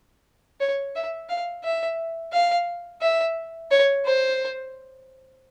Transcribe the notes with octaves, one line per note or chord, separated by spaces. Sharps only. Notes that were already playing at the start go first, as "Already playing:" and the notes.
C#5
E5
F5
E5
F5
E5
C#5
C5